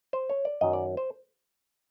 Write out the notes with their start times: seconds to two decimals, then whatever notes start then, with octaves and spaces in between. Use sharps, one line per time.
0.13 C5
0.30 C#5
0.45 D5
0.61 F#2 D#3 F#3 D#5
0.73 D5
0.97 C5